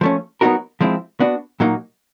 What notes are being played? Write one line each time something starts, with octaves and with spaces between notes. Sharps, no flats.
F3 A3 C#4
F#3 B3 D#4 F#4 A#4
F3 G#3 C4 E4
B3 D4 F#4
A#2 F#3 A#3 D#4